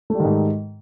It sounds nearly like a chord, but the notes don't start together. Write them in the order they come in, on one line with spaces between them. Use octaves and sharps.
A3 G3 D#3 G#2